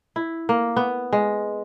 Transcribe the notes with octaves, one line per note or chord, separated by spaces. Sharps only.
E4
A#3
B3
G#3